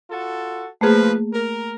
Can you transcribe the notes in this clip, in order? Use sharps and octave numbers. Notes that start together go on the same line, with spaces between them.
F4 F#4 A4
F3 A3 A#3 G#4 B4
A#4